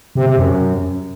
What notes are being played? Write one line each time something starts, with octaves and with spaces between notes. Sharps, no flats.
C3
C3
F#2